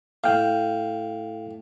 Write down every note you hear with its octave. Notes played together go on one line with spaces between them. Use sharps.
A2 F5 G5